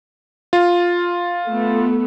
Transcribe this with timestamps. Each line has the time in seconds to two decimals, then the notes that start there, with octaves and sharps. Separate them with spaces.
0.53 F4
1.47 A3 B3